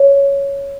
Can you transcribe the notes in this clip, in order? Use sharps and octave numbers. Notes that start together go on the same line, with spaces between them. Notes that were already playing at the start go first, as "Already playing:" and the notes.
Already playing: C#5